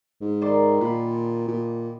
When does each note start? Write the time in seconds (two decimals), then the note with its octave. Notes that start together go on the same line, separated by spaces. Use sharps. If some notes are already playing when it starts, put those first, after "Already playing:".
0.21 G#2
0.41 D#3 D5 C6
0.81 A#2 B5
1.48 A#2